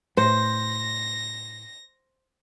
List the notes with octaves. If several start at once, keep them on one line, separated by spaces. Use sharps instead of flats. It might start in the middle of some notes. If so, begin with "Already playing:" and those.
A2 C5 A#6